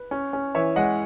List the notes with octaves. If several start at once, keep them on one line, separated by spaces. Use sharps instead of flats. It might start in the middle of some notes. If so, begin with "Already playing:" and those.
Already playing: B4
C#4
C#4
E3 C#5 E5
G#3 D#5 F#5